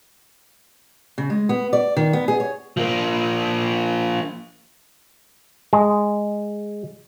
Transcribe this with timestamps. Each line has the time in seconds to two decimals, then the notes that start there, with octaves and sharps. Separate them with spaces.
1.18 C#3
1.30 G#3
1.49 B3
1.73 D5
1.97 D#3
2.13 B3
2.28 G#4
2.40 C#5
2.77 F3 A#3
5.73 G#3